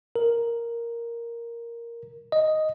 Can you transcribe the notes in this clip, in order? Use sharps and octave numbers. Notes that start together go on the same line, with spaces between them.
A#4
D#5